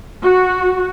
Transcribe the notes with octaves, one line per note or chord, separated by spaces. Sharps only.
F#4